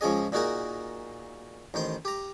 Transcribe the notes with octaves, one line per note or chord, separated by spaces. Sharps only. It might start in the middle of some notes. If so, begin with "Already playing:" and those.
C#2 F3 C#4 G#4 D#5
A#2 D#4 F#4 G#4 A#4
A1 D#3 C5 C6
G4 A#5